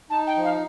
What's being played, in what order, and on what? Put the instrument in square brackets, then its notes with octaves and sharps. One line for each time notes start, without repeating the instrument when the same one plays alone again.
[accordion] D#4 [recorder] A5
[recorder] G5
[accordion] F3
[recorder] F5